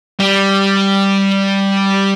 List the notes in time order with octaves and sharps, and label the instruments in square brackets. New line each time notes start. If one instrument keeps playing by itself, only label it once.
[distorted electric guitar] G3